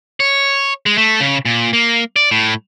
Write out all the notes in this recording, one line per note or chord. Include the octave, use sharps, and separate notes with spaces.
C#5
G#3
A3
C#3
A#2
A#3
D5
A2